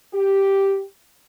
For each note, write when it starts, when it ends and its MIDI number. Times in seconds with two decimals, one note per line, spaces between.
0.14 0.83 67